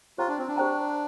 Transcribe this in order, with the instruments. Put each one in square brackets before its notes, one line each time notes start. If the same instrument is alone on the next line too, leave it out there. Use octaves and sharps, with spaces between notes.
[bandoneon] F4 [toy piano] G4 C5 G5 A#5
[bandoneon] D4
C4
D4
[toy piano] G4 C5 G5 A#5